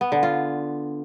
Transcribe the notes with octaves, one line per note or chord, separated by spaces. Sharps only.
B3
D3
F4